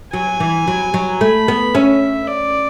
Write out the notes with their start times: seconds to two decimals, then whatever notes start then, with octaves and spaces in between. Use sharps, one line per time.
0.13 F#3 G#5
0.40 E3
0.67 F#3
0.94 F#3
1.21 A3 B5
1.48 B3
1.75 C#4 E5
2.28 D5